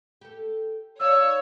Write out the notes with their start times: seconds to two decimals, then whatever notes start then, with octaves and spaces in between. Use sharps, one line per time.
0.21 G4 A4
1.00 D#4 C#5 D5 F5 E6